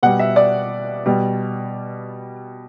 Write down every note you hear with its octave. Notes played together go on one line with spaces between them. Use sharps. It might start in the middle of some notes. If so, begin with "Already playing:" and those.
B2 G3 F#5
E5
D5
B2 G3